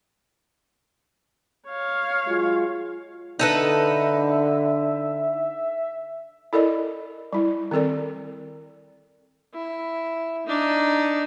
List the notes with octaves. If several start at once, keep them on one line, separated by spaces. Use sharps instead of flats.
C#5 F5
F#3 G#3 F4
D3 D#4 A4 B4 E5
E4 A4 A#4 D5 D#5
G3 E4
D#3 C4 A4 A#4 D5
E4
D4 D#4